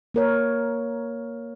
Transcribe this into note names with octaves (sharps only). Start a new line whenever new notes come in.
A#3 A#4 C#5